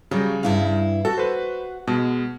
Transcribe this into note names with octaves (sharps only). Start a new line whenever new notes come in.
C#3 F#3 G3
G2 E4 F5
F#4 A4
B4 C5
B2 G#3